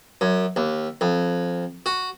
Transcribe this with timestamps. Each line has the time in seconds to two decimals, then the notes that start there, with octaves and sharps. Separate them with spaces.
0.21 F#2
0.56 D#2
1.01 F2
1.86 F#4